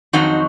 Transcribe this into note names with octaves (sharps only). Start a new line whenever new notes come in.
F2 D#3 F#3 C4 D#4 F#4